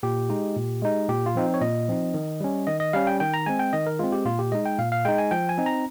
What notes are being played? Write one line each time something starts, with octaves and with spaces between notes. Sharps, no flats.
A#2 G4
G#3 D#4
A#2
G#3 D#4
A#2 G4
F4
F3 C4 D#4
C#5
A#2 D#5
F3 C4 D#4
D#3
G3 C#4
D#3 D#5
D#5
G3 C#4 F5
G5
D#3 G5
A#5
G#3 C4 G#5
G5
D#3 D#5
A#4
G#3 C4 F4
G4
A#2 F4
G4
G#3 D#4 D#5
G5
A#2 F5
F5
G#3 D#4 G5
G#5
F3 G5
G#5
C4 D#4
A#5